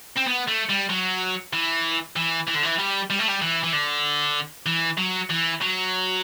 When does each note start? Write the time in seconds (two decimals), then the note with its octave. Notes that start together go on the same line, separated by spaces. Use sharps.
0.17 C4
0.28 B3
0.48 A3
0.70 G3
0.90 F#3
1.53 E3
2.16 E3
2.47 E3
2.54 D3
2.63 E3
2.78 G3
3.10 G3
3.19 A3
3.28 G3
3.42 E3
3.63 E3
3.72 D3
4.66 E3
4.98 F#3
5.30 E3
5.62 F#3